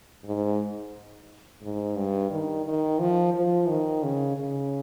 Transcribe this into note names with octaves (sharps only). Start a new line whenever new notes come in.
G#2
G#2
G2
D#3
D#3
F3
F3
D#3
C#3
C#3